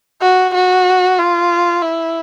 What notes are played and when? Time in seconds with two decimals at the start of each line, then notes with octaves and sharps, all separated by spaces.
0.22 F#4
0.55 F#4
1.18 F4
1.82 E4